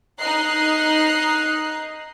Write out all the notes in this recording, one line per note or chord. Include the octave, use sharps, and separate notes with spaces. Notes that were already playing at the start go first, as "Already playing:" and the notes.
D#4 D#5 A#5 F#6 C7